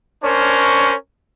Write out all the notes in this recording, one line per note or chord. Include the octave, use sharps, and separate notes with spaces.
C#4 D4 A#4 C5 C#5